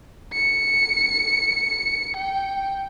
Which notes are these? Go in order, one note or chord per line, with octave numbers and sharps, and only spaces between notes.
C#7
G5